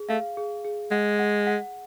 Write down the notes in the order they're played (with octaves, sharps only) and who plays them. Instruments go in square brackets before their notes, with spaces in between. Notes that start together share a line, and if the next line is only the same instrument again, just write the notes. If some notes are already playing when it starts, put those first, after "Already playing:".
Already playing: [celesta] G#4
[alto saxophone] A3 [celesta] F5
[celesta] G#4
G#4
[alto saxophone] G#3 [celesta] F#5
[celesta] F#5
F#5